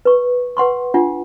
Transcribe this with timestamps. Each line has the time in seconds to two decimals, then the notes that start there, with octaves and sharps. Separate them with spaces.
0.05 B4 C#6
0.57 B4 F#5 C6 C#6
0.94 D4 F4 F#5